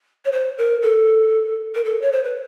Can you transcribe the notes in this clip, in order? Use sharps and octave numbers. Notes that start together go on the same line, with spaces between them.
C#5
C5
A#4
A4
A#4
A4
C#5
C5
B4